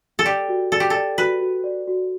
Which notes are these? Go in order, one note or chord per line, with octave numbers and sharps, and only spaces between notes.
A4
G4 D5
F#4
A4 D5
G4
A4 D5
F#4 B4
F#4
D5
F#4